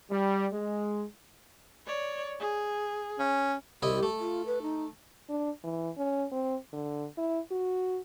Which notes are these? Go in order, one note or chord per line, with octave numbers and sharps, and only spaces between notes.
G3
G#3
C#5 D5
G#4
C#4
C2 E4 G4 D#5
A3
F4
B4
D#4
D4
E3
C#4
C4
D3
E4
F#4